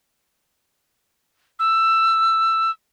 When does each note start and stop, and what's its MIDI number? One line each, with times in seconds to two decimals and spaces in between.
1.59 2.70 88